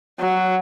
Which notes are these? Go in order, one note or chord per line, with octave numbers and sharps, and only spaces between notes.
F#3